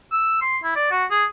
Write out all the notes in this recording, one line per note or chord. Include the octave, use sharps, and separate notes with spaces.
E6
C6
E4
D5
F#4
G#4